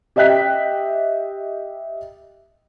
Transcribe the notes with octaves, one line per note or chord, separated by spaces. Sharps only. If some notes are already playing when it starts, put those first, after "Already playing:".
G4 D#5 E5 G5 F#6 B6